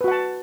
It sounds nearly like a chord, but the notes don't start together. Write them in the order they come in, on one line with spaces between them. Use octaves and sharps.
B4 F#4 F#5 A5